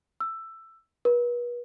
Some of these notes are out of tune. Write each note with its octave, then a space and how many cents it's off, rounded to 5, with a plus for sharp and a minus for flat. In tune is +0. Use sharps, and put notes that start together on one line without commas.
E6 +10
B4 -40